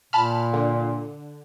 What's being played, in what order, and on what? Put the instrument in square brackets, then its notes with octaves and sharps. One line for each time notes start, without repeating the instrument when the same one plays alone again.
[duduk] A#2 [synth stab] A5 B5 F6
[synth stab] D3